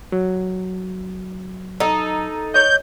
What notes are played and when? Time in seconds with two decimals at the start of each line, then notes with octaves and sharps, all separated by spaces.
0.12 F#3
1.80 D#4 A4
2.54 C#5 D#5 G6